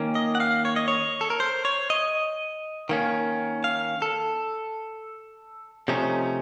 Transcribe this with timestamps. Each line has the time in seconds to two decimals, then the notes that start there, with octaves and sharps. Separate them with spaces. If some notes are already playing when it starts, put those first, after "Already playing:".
Already playing: D#3 A#3 C#4
0.15 D#5
0.35 F#5
0.40 F5
0.65 C#5
0.76 D#5
0.88 C#5
1.21 A4
1.30 A#4
1.40 C5
1.65 C#5
1.90 D#5
2.89 D#3 A#3 C#4
3.64 F5
4.02 A4
5.88 C3 F3 A3 C#4 D#4